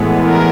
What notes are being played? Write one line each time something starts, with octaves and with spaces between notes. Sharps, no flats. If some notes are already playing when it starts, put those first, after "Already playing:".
Already playing: A2 E3 G#3 B3
A#4